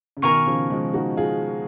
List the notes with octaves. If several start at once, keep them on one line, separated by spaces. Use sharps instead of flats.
C#3
B2 D#3 A#4 F5 G#5 C#6
C#3 F3
F3 G#3
D#4 F#4
F4 G#4